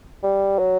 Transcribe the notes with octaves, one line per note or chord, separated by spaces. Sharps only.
G3
F#3